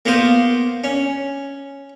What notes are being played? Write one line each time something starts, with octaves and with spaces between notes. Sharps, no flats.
A#3 B3 F4 C5
C#4